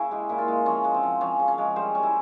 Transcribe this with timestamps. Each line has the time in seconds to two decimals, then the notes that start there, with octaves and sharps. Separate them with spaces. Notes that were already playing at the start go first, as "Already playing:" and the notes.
Already playing: C#3 C#4 E4
0.11 G#3 G4
0.29 A#2 E4
0.38 F4
0.48 G#3
0.66 F3 C#4
0.84 G#3
0.94 C4
1.03 F3
1.21 F3 C#4
1.39 C#3
1.48 C#4
1.58 G#3
1.76 G3 C5
1.95 G3 C#4
2.03 E4